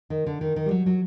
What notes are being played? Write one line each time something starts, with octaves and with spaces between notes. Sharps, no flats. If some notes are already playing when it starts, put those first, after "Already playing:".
D#3
D3
D#3
D#3
G3
F#3
F#3